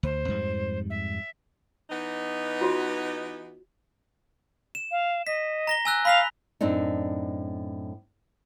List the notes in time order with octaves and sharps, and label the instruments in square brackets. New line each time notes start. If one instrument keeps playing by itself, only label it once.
[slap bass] D2 [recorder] C5
[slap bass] F2 G#2 G3
[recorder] E5
[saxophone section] E3 B3 D#4
[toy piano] F4 F#4 C#5
[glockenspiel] E7
[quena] F5
[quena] D#5 [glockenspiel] B6
[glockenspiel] A#5 A#6 G7
G#5 E6 F#6
[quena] F5 [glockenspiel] B5 B6 F7
[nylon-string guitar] F#2 A2 C4 D4 D#4